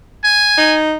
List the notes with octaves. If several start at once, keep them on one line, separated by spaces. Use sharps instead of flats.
G#5
D#4